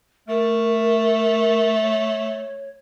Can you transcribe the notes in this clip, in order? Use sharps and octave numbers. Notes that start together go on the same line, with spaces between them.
A3 A#4
C#5